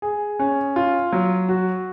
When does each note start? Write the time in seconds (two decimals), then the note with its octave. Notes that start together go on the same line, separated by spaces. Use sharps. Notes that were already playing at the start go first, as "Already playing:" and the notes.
0.02 G#4
0.39 C#4
0.76 F4
1.13 F#3
1.49 F#4